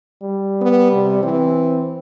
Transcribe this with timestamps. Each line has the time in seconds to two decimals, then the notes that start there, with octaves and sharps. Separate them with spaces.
0.22 G3
0.61 B3
0.92 C3
1.23 E3 C4